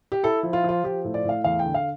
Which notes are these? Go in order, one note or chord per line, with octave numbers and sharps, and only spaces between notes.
G4
E4 A4
F3
F4
F3 F4
F3 G4
A2
D5
A2
F5
E2 F5
G5
D3
F5